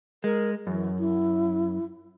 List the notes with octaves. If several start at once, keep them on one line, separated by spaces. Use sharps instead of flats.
G#3 A#4
F#2 E3
E4